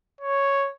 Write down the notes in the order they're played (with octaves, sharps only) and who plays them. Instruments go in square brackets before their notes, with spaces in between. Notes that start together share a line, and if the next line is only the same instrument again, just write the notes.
[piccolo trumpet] C#5